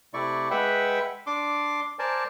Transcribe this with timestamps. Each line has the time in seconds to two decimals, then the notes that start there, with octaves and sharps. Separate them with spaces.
0.14 C3 A3 E4 D5 C#6
0.51 G#3 B4 E5 F#5 G5
1.27 D4 C6 D6
1.99 A#4 C5 D5 G#5 A5